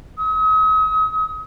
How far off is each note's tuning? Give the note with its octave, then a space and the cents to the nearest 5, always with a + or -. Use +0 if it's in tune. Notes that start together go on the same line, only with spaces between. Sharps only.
D#6 +40